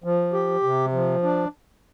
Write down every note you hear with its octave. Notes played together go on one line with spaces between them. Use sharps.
F3
G4
C3
F3
D4